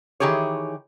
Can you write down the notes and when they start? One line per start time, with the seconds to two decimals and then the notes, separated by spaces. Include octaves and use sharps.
0.20 D#3 E3 G4 G#4 C#5